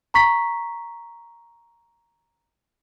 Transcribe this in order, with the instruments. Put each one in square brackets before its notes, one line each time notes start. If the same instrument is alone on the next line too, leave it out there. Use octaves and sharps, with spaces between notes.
[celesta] A#5 C#6 B6